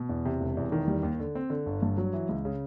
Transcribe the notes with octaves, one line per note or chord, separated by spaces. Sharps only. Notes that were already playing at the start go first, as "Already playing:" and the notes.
Already playing: B2
E2
C3
E1
E2
D#3
G3
D#2
D3
C4
D3
G1
G2
F#3
E3
C#2
C#3